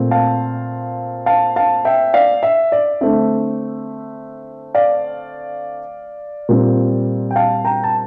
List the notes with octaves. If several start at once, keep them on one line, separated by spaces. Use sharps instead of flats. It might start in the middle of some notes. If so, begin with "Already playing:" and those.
Already playing: A#2 A3 C4
F5 A5
F5 A5
F5 A5
E5 G5
D5 F5
E5
D5
D3 A3 C4 E5
D5 F5
A#2 G3 C4
G5
F5 A5
G5 A#5
A5